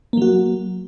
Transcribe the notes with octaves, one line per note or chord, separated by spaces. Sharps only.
F#3 A#3 F#4